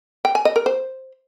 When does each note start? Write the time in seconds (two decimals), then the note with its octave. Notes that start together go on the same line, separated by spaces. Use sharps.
0.25 G5
0.35 G#5
0.45 D#5
0.56 A#4
0.66 C5